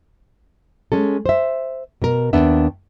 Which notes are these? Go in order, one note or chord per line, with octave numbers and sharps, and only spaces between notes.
G#3 C#4 A4
C5 E5
B2 A#4
D#2 B3 D4 E5